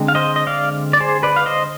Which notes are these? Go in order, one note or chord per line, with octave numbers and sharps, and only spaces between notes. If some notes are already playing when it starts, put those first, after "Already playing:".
Already playing: D3 G#3 C4
F5
C5 D#5
D#5
D5 F5
D5
G#4 C5
B4 D5
F5
C5 D#5